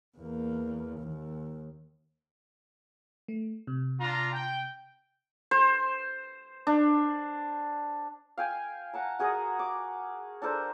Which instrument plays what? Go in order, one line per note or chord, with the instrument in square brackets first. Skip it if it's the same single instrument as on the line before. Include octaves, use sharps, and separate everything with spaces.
[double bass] E2 A#3
D#2
[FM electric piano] A3
C3
[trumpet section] D4 F4 A#5
G5
[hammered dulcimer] C5
D4
[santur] F5 G5 G#5
F#5 A5 A#5
F#4 G#4 A#4 D#5
D6
D4 A4 A#4 C5